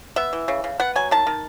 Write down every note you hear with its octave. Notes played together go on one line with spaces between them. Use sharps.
B3 E5
E3
C#3
C#3
B3 F#5
F#3 G#5
D#3 A5
D#3